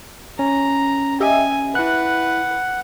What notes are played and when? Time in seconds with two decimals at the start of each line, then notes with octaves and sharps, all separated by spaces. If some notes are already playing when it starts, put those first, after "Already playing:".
0.39 C#4 A#5
1.20 G4 D#5 E5 G#5
1.75 E4 B4 F#5 F#6